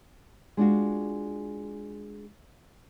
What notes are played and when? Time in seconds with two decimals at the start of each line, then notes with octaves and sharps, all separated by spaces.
0.57 G#3 D4 F4 F#4